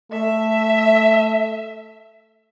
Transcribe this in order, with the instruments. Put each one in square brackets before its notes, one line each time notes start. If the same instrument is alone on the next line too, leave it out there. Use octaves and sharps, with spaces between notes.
[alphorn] A3 [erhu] E5